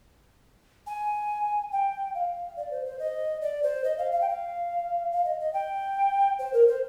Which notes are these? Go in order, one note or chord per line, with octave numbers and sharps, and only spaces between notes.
G#5
G5
F5
D5
C5
C5
D#5
D5
C5
D#5
F5
F5
G5
F5
F5
D#5
D#5
G5
C5
A#4
C5